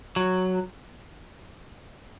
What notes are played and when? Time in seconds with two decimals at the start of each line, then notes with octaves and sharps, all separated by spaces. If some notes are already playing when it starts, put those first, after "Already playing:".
0.16 F#3